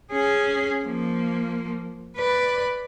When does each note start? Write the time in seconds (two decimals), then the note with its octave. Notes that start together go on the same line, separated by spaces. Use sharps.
0.12 C#4 G#4
0.85 F3 A#3
2.17 B4 D5